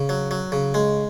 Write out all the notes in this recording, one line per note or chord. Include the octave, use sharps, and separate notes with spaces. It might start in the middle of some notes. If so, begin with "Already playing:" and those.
Already playing: C#3
F#3
F#3
C#3
G#3